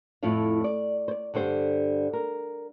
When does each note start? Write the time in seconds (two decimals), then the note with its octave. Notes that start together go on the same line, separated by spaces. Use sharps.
0.23 F2 A2 E4 F4 F5
0.64 D5
1.08 C5 D5
1.34 G2 D3 G3 C5
2.13 A#4